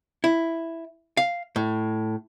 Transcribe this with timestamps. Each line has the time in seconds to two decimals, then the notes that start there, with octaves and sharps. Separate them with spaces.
0.24 E4
1.17 F5
1.56 A2